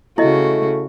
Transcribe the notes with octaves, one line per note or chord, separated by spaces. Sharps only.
C#3 A3 E4 F#4 D#5